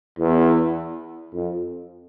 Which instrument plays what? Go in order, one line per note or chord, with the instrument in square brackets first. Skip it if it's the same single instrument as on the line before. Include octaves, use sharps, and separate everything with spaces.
[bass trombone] E2
F2